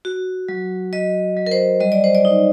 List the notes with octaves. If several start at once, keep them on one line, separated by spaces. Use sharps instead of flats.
F#4
F#3
F#3 D#5
F#3
A#4
C5
G3 D#5
D5
C5
D5
D#4